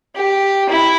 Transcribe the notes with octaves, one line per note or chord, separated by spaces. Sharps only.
G4
E4